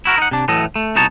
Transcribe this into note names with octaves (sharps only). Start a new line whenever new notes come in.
E4 F#4 A#4
D#4 F#5
C3 D4
A2 E3 F#3 A4 D#5
A3
C2 B2 D#4 C#5 A5